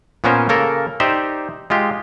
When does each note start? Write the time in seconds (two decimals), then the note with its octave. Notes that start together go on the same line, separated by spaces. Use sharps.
0.24 A#2 B3 C#4 A#4 C5 G#5
0.49 C#3 A#3 A4 A#4
1.00 D#4 G4 C5 D5 E5
1.70 G#3 F4 G4